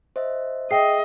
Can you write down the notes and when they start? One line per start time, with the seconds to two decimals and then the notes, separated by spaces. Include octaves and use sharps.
0.16 C5 D#5 E5
0.71 G#4 D#5 E5 G5 C7